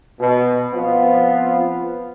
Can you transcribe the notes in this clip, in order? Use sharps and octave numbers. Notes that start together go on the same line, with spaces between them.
B2
F3 B3 C4 F4